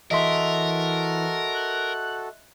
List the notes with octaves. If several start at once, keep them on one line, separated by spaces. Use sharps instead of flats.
E3 F#4 A4 A#4 D#5 E5 C6
F#6